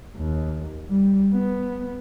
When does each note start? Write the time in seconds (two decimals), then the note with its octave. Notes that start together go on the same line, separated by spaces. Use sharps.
0.17 D#2
0.90 G3
1.34 B3